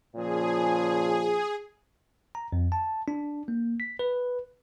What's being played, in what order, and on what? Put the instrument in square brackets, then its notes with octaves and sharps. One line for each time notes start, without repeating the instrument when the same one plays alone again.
[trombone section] A#2 C#3 F3 [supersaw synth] G#4
[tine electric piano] A#5
F2
A5
D4
A#3
B6
B4